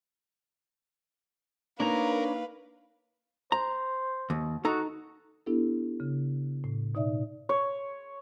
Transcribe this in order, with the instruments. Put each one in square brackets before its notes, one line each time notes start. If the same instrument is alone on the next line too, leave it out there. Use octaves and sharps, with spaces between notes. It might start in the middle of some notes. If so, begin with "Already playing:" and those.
[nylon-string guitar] A#3 D#4 [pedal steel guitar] D4 C#5 A#5 [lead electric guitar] A#4 [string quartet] B4 F5
[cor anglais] C5 [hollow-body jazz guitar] A#5
[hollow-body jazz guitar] D#2
[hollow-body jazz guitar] D#4 A4 A#5 [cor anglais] F#4
[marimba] B3 D4 E4 G4 A4
C#3
A2
B2 D#4 D5 E5
[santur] C#5